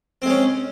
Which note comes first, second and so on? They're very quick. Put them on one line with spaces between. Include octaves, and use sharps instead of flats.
C4 G#3 C#4